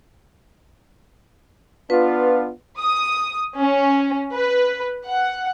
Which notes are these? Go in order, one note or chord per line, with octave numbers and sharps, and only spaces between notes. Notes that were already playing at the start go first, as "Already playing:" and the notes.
B3 D4 F4 B4
D#6
C#4
B4
F#5